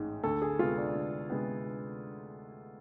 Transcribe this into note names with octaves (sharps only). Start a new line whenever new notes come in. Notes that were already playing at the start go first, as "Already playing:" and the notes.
Already playing: A1 G#2 G#3
D2 A4
G#4
C3 G#3 B3 F4
D4
D2
C3 G#3 B3